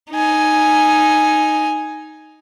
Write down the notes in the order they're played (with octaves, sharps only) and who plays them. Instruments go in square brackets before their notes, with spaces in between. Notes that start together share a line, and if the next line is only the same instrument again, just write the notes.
[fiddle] D#4 G#5